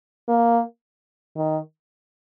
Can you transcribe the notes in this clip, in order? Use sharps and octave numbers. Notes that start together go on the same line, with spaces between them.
A#3
D#3